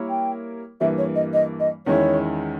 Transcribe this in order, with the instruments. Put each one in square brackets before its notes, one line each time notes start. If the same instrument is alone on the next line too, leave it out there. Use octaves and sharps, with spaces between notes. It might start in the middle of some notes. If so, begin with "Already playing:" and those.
Already playing: [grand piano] G3 A#3 E4 A#4 C#5
[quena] G5
[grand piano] G2 E3 A#3 [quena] E5
[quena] C#5
D#5
D#5
D#5
[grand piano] E2 D#3 G#3 C#4 E4 [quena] C#5